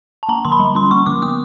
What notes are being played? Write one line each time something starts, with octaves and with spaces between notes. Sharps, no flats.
A5
A#3 A#5
D3 C6
B5
G3
C#4 C6
A#3 C#6
D3 D6
B3 D#6